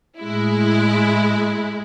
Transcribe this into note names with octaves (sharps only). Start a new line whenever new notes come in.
A2 G#3 E4